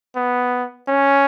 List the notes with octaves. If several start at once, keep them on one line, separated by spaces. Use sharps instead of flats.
B3
C#4